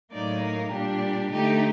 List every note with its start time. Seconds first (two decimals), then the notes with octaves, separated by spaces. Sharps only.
0.12 A2 F#3 A#3 D#4 D5
0.43 A#4
0.71 A#2 G3 D4 G4
1.31 D3 A3 D#4 G4